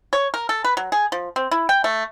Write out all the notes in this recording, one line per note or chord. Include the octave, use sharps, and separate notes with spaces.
C#5
A#4
A4
B4
F#3
G#4
F3
C4
E4
G5
A3